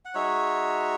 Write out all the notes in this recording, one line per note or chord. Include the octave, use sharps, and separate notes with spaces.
F#5
G#3 D#4 F#4 C#5 E5